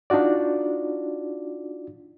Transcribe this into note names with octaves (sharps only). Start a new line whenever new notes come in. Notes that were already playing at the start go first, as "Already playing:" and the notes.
D4 D#4 F4 F#4 D5